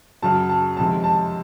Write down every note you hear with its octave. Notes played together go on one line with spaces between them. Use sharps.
F#2 C#3 F#3 A5
A5
F2 C3 D#3 G#3 A5
A5